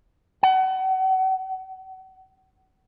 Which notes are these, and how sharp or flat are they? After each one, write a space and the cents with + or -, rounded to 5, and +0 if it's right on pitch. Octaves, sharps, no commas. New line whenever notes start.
F#5 +35